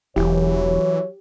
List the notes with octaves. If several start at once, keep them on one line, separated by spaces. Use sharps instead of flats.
E1 E3 F#3 G4 C#5